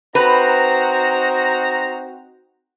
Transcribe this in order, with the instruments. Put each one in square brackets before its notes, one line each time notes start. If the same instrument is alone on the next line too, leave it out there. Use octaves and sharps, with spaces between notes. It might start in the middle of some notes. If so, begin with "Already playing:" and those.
[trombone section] C4 D#4 F#4 [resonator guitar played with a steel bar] B4 [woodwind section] C5 A#5